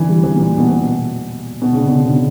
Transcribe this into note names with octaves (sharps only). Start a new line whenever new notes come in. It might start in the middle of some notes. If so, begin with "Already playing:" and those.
Already playing: D3 E3
G3
E3
A#2
B2
B2
B2
C#3
D3
B2
C#3
B2